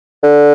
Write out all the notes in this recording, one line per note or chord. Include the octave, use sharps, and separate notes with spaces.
D3